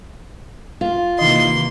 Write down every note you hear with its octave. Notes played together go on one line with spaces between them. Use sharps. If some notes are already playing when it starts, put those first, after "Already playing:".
F4
C3 D#3 E3 A#3 D#5 C6